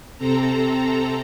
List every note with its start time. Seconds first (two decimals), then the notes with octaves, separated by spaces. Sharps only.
0.18 C3 C4 A4 A#5